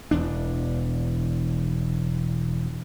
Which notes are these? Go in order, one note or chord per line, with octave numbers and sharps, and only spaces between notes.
E1 E2 D4